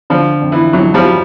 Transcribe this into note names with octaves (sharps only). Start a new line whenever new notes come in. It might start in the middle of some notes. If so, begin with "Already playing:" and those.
D3 F3
F2
E3
F2 E3 F#3
F3 G3
F#3